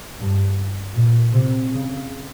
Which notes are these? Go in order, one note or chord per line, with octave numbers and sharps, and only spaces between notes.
G2
A#2
C3
C#3